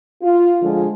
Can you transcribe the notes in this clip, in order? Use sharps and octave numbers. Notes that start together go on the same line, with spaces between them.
F4
D3 F3 G#3